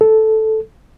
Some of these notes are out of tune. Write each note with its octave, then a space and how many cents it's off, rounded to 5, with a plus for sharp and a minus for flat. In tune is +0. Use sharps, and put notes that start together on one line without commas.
A4 -5